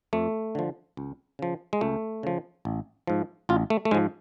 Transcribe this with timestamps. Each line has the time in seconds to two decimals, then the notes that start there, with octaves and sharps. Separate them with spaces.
0.13 F2 A3
0.55 D3 F3
0.97 C#2
1.39 C#3 F3
1.73 G#3
1.81 C#2 A3
2.23 C#3 F3
2.65 A1
3.07 G#2 F3
3.49 A1 F4
3.70 A3
3.85 A3
3.91 G#2 F3 G#3